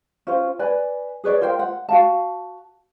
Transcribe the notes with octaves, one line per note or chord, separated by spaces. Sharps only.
C#4 F4 C5
B4 D5 G#5
G#4 B4 C#5 D5
F4 A#4 C5 G5
F#5
F#4 F5 A5